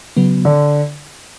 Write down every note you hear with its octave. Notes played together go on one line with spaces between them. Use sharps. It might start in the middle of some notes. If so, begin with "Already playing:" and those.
C#3 F#3 B3
D3